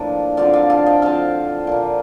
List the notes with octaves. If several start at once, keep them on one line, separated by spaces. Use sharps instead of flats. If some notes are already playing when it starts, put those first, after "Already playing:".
Already playing: A2 F3 A#3 D4
D3 F3 C4 D5 F5
D5 F5
F5 A5
D#5 G5
D3 F3 C4 F5 A5
A#2 F3 A#3